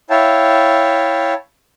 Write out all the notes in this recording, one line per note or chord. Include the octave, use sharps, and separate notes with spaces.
E4 C#5 E5 F5 G5 A5